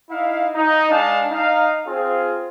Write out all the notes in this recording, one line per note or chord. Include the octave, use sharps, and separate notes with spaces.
D#4 E4 F5
D#4
G#3 D4 F5 A5
D#4 F5
C4 F4 G#4